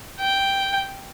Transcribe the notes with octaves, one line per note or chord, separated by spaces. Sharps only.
G5